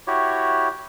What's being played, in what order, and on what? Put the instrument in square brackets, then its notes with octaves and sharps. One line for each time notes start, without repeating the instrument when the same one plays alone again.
[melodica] E4 F#4 G4 C#5